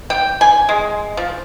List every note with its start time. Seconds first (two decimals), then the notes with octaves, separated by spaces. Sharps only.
0.10 G5
0.41 G#5
0.69 G#3
1.17 F3